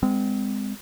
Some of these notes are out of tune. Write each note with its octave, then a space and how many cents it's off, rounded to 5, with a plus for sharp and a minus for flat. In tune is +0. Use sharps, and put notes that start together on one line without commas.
G#3 -20 C4 -30